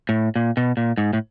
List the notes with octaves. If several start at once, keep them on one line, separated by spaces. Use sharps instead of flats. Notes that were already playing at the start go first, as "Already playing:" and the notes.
A2
A#2
B2
A#2
G#2
A2